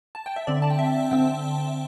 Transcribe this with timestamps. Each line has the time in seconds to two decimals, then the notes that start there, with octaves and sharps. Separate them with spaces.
0.15 A5
0.26 G5
0.36 E5
0.47 D3 C4 D5
0.62 A5
0.70 G5
0.79 E5
1.11 D3 C4 G5